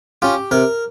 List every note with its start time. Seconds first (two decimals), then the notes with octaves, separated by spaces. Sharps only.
0.22 C#4 F4 G4
0.51 C3 A#4